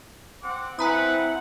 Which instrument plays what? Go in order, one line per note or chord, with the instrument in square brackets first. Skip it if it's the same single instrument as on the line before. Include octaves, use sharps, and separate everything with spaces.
[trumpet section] C4 F#5 D6
[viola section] C4 F#5 [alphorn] E4 [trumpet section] B4 [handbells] G#5 A#5 D#6